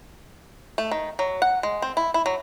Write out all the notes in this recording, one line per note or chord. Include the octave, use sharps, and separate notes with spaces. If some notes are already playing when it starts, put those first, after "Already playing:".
A3
D#3
F#3
F#5
G#3
C4
E4
E4
F#3